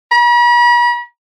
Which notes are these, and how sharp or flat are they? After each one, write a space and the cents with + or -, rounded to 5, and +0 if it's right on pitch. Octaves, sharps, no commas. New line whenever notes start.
B5 -45